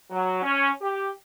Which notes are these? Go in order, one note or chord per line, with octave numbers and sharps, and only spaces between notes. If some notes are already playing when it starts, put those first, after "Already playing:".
F#3
C#4
G4